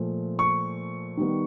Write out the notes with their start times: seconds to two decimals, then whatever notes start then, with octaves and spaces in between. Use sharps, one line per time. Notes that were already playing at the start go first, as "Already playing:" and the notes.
Already playing: A#2 F3 A3
0.39 C#6
1.17 D#3 G3 B3